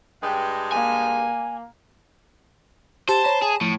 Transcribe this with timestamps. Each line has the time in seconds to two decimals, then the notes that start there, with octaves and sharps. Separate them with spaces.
0.23 G2 G#3 G5
0.72 A#3 G#5
3.09 G4 C5 A5
3.24 C#5 A#5 B5
3.42 G#4
3.61 A2 F3